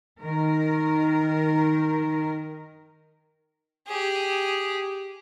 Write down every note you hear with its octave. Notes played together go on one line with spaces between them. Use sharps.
D#3 A#4
G4 G#4